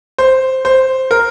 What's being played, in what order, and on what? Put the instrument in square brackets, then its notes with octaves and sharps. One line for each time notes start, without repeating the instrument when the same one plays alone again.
[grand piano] C5
C5
A#4